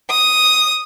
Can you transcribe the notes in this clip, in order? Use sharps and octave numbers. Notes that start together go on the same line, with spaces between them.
D#6